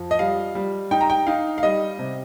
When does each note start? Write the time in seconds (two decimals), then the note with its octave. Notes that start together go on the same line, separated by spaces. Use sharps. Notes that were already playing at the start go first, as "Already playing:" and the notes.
Already playing: F2 F3
0.11 D#5
0.19 G3 F5
0.55 G3
0.91 D#4 G5
1.01 A#5
1.10 G5
1.27 D#4 F5
1.58 F5
1.63 G3 D#5
1.99 C3